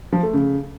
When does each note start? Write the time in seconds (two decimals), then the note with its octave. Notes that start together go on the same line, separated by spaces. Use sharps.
0.13 F3
0.23 A3
0.33 C#3